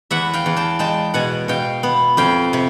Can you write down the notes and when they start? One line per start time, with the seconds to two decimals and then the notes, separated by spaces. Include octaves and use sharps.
0.11 E2 E5 F#5
0.33 F5 G5
0.46 E2
0.56 G5 A5
0.79 G#3 G5 A5
1.14 B2 F#5 G#5
1.48 B2 F5 G5
1.83 B3
2.17 F2 F5 G5
2.53 C3